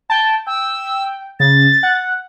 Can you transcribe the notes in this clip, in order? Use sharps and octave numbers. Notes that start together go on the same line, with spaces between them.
G5 A5
G5 E6
C#3 A6
F#5